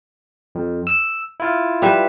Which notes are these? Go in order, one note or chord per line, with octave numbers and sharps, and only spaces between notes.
F2
E6
E4 F4
G3 B4 E5